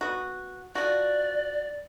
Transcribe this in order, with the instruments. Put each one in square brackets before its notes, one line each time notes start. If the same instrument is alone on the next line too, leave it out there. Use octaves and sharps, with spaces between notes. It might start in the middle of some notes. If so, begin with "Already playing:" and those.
[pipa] B3 F#4
[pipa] F3 F#4 [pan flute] D5